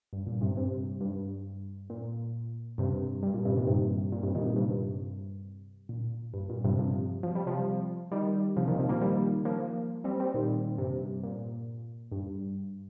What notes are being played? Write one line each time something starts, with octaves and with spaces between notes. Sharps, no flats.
G2
A#2
G2 C3
G2 C3
G2
A#2
G2 C3
G2
A#2
G2 C3
A#2 D#3
G2 C3
A#2
G2 C3
A#2 D#3
A#2
G2 C3
A#2
G2
A#2
G2 C3
C3 F3
F3
G3
C3 F3
D#3 G3
C3 F3
A#2 D#3
C3 F3
F3 A#3
D#3 G3
F3 A#3
G3 C4
G3 C4
A#2 D#3
G2 C3
A#2
G2